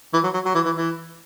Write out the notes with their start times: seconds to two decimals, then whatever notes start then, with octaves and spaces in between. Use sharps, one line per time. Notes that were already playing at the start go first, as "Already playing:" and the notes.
0.13 E3
0.24 F#3
0.34 F#3
0.45 F#3
0.55 E3
0.65 E3
0.76 E3